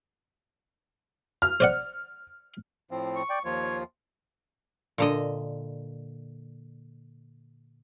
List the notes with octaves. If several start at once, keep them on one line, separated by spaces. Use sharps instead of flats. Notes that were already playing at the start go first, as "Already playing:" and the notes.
F6
C5 D5 F#5
A2 F3 C4
C#6
D5 G5
D#2 F3 F4 C#5
A#2 D3 D#5